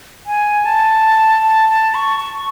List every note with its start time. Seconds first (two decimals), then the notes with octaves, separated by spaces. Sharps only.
0.26 G#5
0.65 A5
1.43 A5
1.69 A5
1.95 C#6
2.20 C#6